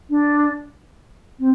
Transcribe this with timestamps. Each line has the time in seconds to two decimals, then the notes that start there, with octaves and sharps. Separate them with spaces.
0.10 D4
1.40 C4